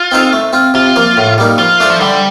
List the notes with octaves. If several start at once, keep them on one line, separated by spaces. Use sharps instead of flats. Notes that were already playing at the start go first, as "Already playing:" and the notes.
Already playing: F4
C4 D#4 A4 C5
A3
C4 F4
C3 F4
F3 A#3
A2
G3 A#3 D#4
F3 F4
A3 D4 A4 C5
F3
D3 G3